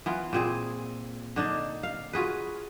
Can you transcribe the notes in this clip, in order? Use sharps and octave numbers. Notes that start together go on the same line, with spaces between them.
E3 B3 F4
A#2 C4 G#4
D3 D4 D#4
F5
F4 F#4 G#4 B4